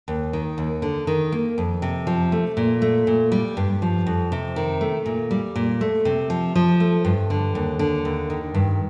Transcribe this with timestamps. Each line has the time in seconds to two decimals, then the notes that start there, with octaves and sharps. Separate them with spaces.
0.08 D#2
0.33 D#3
0.58 D#2
0.82 D3
1.07 D#3
1.32 A#3
1.58 F2
1.82 C3
2.07 F3
2.32 A3
2.57 A#2
2.82 A3
3.07 A#2
3.32 G3
3.57 G2
3.82 F3
4.07 F2
4.32 C3
4.56 D#3
4.81 A3
5.06 A#2
5.31 G3
5.56 A#2
5.81 A3
6.05 C3
6.30 F3
6.55 F3
6.80 A3
7.05 G2
7.30 D3
7.55 D#2
7.79 D3
8.05 D#2
8.30 D#3
8.55 G2